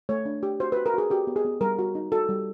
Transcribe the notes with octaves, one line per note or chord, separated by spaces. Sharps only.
A3 C#5
D4
G4
F#4 C5
F#4 B4
A#4
F#4 G#4
F#4 G4
B3
G#4
B3
G3 A#4
F#4
D#4
F#4 A4
G3